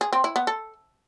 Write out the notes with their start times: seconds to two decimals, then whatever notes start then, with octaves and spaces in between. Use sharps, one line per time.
0.01 G#4
0.13 C4
0.24 E4
0.36 B3
0.47 A4